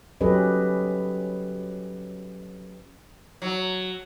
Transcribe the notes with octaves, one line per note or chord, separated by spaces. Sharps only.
F#3 C#4 G4 A4 B4 D#5
F#3